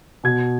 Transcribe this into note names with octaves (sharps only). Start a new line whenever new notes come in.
B2 G#6